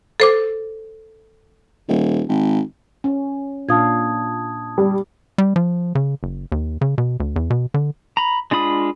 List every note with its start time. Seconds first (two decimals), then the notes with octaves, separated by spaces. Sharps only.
0.20 A4 C5 D6
1.88 D#1
2.29 G#1
3.04 C#4
3.69 A#2 D4 F5 A5 D#6 G#6
4.78 G3
5.38 G3
5.56 F3
5.95 C#3
6.23 F#1
6.52 D#2
6.81 C#3
6.98 B2
7.20 D2
7.36 E2
7.50 B2
7.74 D3
8.17 A#5 B5
8.51 G#3 D4 F4 B5 D#6